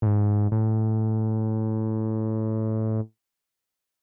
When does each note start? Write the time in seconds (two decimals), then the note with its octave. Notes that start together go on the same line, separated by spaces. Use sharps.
0.02 A2
0.06 G#2
0.52 A2